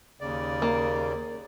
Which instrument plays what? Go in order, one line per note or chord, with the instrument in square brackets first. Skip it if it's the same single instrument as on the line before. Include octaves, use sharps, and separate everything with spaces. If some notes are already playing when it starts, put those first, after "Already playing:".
[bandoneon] D#2 C#3 D5
[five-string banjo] A#3